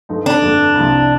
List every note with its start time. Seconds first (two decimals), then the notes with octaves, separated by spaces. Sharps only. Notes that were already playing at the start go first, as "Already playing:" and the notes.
0.09 G2 F3 A3 D#4
0.26 D4
0.42 G1 F2 D3 A3
0.75 C2 C3 F3